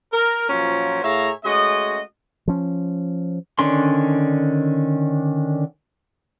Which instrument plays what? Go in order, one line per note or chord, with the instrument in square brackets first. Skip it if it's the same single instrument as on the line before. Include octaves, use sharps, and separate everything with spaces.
[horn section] A#4
A#2 F3 F#3 C#4 A#4 C5
A2 G#4 C#5 E5 F5 A#5
G#3 A3 C#4 F#4 D#5
[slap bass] F3 C#4
[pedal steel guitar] D3 D#3 C#4 D4 C6